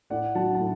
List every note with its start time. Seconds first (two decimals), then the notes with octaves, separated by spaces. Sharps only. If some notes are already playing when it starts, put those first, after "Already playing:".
0.10 A2 D5 F#5
0.35 F#3 F#5 A5
0.54 A5
0.60 A2